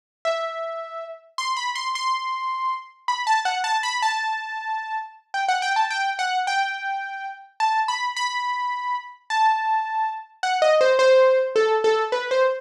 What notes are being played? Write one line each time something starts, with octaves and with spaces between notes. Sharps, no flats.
E5
C6
B5
C6
C6
B5
A5
F#5
A5
B5
A5
G5
F#5
G5
A5
G5
F#5
G5
A5
B5
B5
A5
F#5
D#5
C5
C5
A4
A4
B4
C5